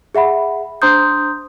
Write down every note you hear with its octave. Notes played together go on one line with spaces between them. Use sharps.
G#4 E5 F#5 B5
D4 C5 A#5 C6 D#6 G6